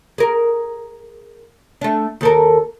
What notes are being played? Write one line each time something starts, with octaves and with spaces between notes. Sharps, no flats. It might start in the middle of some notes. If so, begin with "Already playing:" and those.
G#4 A#4
A3 D4
D#2 A4 A#4